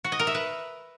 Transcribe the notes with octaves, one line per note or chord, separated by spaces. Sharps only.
F#4
D#5
A#4
E5
B4